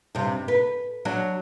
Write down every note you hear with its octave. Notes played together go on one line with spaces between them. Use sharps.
G2 C3
B4
F#3 D4